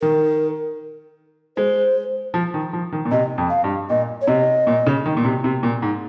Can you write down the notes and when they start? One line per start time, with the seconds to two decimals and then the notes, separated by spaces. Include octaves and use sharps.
0.01 D#3 A#4
1.57 G#3 C5
2.34 F3
2.54 D#3
2.73 F3
2.92 D#3
3.05 A#2
3.11 C3 D#5
3.38 F2
3.50 F5
3.64 G2
3.90 A#2 D#5
4.22 C#5
4.27 C3 D#5
4.67 A#2
4.86 C#3
5.06 D#3
5.17 A#2
5.25 C3
5.44 C3
5.63 A#2
5.82 G#2